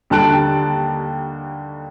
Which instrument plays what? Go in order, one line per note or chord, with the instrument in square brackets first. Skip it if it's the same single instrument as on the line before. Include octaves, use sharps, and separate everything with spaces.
[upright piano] D#2 D3 G3 A5 F#6 D7